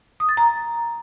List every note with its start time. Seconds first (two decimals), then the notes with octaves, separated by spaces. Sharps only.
0.20 D#6
0.29 A6
0.37 A#5